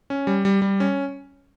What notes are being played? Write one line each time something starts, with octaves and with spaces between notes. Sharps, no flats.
C#4
G3
G3
G3
C#4